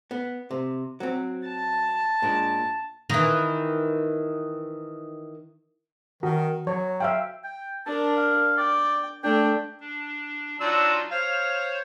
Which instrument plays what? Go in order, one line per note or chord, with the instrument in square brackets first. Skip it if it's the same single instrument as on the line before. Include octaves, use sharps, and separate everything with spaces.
[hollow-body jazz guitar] B3
C3
F#3 C4
[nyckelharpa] A5
[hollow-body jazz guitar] A#2 G#3 D4
[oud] D#3 E3
[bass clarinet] D#3 [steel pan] F#4
[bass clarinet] F#3 [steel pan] C#5
[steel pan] E5 F5 G5
[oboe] G5
[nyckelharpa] D4 A#4 [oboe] A5
[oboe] F5
[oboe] D5 [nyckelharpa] G5
[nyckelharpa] A3 D4 [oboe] G5
[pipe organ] D4
[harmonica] F#3 D4 E6 [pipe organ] D#4 F4
[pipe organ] C5 C#5 [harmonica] F5